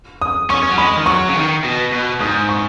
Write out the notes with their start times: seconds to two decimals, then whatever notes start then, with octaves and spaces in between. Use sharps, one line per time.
0.22 D#6
0.50 C#4 C#6
0.63 C#4
0.71 F#3
0.78 G#3 B5
0.97 D#3
1.06 F#3 C#6
1.29 C#3
1.35 D#3
1.64 B2
1.92 B2
2.20 G#2 D#6
2.49 C#6